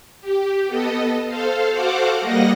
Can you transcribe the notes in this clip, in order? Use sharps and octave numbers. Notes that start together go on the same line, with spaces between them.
G4
B3 A4 D#5
A4 C5 F5
F#4 A4 C5 F5 F#5 D6
G3 A#3 D#5 F#5 A#6